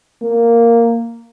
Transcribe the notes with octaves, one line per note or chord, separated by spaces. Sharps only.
A#3